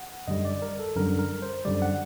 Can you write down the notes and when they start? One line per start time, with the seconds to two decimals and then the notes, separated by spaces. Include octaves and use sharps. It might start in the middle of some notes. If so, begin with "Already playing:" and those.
Already playing: F#5
0.28 F#2 D3 G3 D#5
0.45 D5
0.62 A#4
0.79 A4
0.96 F#2 D3 G3 A#4
1.19 A#4
1.42 C5
1.65 F#2 D3 G3 D5
1.82 F#5